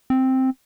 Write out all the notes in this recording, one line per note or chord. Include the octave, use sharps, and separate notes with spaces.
C4